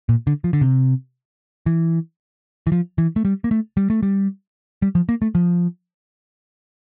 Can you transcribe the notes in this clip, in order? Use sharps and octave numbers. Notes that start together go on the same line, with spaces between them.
A#2
D3
F3
D3
C3
E3
E3
F3
E3
A3
G3
A#3
A3
G3
A3
G3
G3
F3
A#3
A3
F3